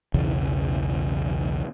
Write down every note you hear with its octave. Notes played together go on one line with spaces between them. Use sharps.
B1 E2 C#3 E3